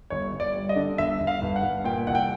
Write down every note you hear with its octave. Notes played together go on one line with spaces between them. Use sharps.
G1 C#5
G1
D5
G3
D#5
D3
G1 E5
G1
F5
G2
F#5
G2
A#2 G5
C2 F#5
G5